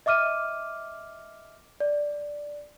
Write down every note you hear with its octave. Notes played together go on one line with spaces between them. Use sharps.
D#5 E5 D6 F6 D#7
D5